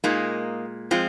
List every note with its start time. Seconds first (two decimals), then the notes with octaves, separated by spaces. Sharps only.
0.04 A#2 G#3 A#3 D#4
0.91 F3 G#3 C4 F4